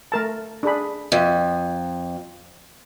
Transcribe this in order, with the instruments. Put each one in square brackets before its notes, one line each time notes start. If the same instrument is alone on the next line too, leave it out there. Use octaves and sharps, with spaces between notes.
[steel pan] A3 A#4 A5
D4 G#4 B5
[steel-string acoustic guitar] F2 [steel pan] E5